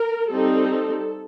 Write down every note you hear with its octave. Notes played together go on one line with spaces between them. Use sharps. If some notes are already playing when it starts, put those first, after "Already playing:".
Already playing: A#4
G3 C4 D#4 A4